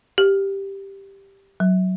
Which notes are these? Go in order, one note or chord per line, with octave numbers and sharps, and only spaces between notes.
G4
F#3